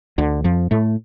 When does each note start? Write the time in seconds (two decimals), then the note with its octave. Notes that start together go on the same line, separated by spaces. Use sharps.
0.18 D2 D3
0.44 F2 F3
0.71 A2 A3